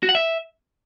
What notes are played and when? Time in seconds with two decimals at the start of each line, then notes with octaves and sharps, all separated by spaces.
0.03 F#4
0.09 F#5
0.15 E5